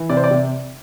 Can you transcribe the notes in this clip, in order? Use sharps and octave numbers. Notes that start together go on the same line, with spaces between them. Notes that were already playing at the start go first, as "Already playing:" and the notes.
Already playing: E3
C3 D5
C5
D5
C3